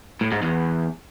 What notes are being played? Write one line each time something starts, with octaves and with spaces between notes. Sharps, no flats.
A2
G#2
E2